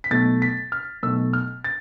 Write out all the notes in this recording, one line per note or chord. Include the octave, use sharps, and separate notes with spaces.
B6
B1 B2 A3 A6
B6
F6
B1 B2 A3 E6
F6
A6